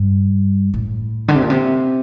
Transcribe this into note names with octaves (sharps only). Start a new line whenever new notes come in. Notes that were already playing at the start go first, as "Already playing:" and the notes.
Already playing: G2
A2
D3
C3
A#2
C3